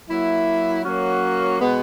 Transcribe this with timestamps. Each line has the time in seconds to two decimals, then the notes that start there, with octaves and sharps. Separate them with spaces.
0.09 F#3 A#3 E4
0.84 F#3 A#3 C#4 F#4
1.60 B2 G#3 B3